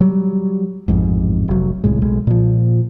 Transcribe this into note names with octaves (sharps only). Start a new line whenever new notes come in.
F#3 G3
A1 F2 G#2
F1 F#3
D#1 C2 A2 G#3
B1 G#3
A#2 F3